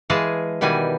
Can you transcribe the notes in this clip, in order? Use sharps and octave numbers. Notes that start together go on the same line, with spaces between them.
E3 G#3 G#4 F5 A5
B2 D#3 E3 G3 G#5